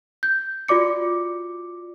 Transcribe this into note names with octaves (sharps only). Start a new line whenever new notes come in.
G6
F4 F#4 D5 D6 C#7